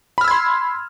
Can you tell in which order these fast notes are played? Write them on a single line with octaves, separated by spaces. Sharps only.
B5 F6 E6 G#6 C6